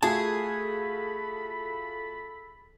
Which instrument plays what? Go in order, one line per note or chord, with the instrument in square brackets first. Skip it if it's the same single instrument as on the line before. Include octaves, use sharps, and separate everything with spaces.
[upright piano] A3 F4 F#4 [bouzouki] G#4 [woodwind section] A4 B5 [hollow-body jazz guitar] A5